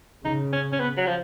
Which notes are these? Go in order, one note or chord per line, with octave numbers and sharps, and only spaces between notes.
C#3 D#4
C#4
C#4
B3
F#3
F3